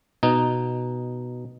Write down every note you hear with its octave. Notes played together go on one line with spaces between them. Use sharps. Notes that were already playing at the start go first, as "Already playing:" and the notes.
B2 D#4